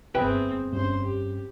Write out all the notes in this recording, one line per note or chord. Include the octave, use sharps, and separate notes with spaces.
G1 F2 C4 G#4 B4 E5 G5
G2 C#4 C5 C6
G4